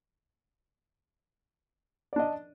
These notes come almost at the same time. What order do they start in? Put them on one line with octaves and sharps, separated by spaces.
D5 D4 D#5